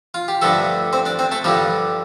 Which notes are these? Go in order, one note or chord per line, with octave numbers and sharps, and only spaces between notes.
F4
G4
G2 D3 F3 A3 A4
C4 C5
D4 D5
C4 C5
A3 A4
G2 D3 F3 G3 G4